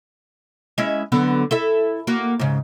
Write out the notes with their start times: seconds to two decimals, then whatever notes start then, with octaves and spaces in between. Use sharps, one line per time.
0.78 G#3 C#4 E4
1.12 D3 F#3 B3
1.51 E4 A4 E5
2.07 A#3 F#4
2.39 G#2 C#3